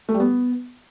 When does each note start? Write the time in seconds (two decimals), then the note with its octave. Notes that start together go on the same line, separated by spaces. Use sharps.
0.09 A3
0.14 G3
0.20 B3